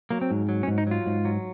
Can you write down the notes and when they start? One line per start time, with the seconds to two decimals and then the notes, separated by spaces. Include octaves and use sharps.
0.11 F#3 A#3
0.21 C4
0.31 G#2
0.49 F#3
0.63 C#4
0.68 G#2
0.78 D#4
0.87 F#3 F4
1.06 G#2
1.25 F#3